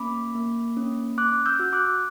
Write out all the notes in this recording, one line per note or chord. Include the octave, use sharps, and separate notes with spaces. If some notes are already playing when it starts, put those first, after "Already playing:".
Already playing: A#3 C#4 B5 D6
A#3
C#4
C#4 D6 F#6
E6 G6
F#4
D6 F#6